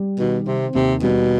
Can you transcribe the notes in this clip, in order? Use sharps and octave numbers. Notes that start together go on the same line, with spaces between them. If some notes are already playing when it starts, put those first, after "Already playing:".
Already playing: G3
B2 D#3
C3 C4
D#2 C3
B2 G3